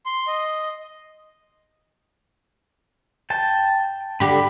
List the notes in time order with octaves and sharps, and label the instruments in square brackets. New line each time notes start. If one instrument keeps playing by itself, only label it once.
[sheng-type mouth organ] C6
D#5
[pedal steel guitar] G5 A5
[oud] D3 G4 [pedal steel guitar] B5